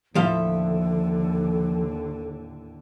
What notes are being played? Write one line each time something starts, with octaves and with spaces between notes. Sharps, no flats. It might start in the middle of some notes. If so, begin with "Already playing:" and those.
D#2 A2 D3 F3 A4 E5 F5